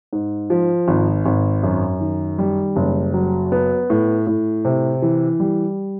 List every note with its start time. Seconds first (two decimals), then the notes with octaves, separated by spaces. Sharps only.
0.13 G#2
0.50 F3
0.88 G#1
1.26 G#1
1.63 F#2
2.01 D#3
2.39 G3
2.76 F#1
3.14 F#3
3.52 B3
3.90 A2
4.27 A2
4.65 C3
5.02 E3
5.40 G3